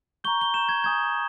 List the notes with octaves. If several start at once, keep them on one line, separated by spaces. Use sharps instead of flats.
A#5 C#6 G6 G7
G7
A#5 C#6 G6 E7
G#6
G#5 D#6 G6 G#6